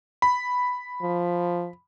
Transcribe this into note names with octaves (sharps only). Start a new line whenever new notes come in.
B5
F3